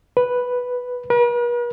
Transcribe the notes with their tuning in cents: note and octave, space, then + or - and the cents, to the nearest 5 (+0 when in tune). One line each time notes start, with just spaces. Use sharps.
B4 +0
B4 -45